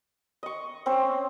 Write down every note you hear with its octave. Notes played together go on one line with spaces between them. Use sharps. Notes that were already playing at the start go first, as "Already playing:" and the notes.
D#5 C#6
C4 C#4 C5